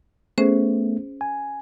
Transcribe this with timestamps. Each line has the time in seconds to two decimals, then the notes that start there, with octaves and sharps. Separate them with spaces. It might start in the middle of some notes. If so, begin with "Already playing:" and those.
0.38 A3 B3 C#4 G#4 C5
1.21 G#5